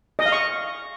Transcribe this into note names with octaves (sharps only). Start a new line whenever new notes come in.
D#5
F5
C#6